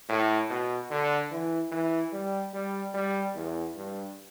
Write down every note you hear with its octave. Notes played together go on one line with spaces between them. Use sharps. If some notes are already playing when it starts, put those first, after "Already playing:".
A2
B2
D3
E3
E3
G3
G3
G3
E2
G2